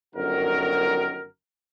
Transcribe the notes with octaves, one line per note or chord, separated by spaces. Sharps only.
G1 F#2 D#3 F#4 A#4